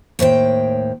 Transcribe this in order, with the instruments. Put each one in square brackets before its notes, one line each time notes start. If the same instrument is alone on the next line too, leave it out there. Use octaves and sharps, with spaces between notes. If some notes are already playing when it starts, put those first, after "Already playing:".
[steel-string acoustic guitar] D#2 A2 C5 G5